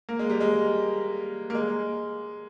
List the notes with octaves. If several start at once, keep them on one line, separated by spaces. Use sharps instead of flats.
A#3
G#3
G3
G#3
A#3
G#3